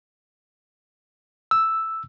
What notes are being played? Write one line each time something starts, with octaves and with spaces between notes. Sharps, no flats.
E6